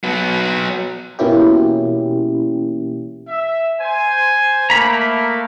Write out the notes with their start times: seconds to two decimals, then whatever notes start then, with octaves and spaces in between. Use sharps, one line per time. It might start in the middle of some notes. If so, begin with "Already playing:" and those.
0.04 F#3 B3
1.19 B2 E3 A#3 C#4 E4 G4
3.28 E5
3.80 C5 G#5
4.70 A3 A#3 A#5 B5